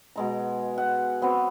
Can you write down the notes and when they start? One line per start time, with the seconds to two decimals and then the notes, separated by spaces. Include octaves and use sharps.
0.16 B2 G#3 A#5
0.78 F#5
1.22 F#3 B3 C4 C#5